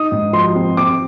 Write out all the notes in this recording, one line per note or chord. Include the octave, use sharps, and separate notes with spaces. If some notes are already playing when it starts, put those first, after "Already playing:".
Already playing: D#4 D#6
G#2
F3 C6
C4
C4 D6